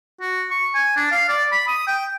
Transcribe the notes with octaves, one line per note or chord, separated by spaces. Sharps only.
F#4
C#6
G#5
D4
F5
D5
B5
D#6
G5